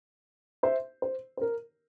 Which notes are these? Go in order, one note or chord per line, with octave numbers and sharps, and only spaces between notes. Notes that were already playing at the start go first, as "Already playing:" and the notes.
C5 E5
C5
C5
A#4